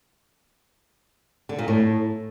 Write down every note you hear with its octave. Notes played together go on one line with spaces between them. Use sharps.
D3
A#2
A2